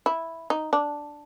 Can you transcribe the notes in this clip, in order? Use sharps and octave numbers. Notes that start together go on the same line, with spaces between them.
E4
D#4
D4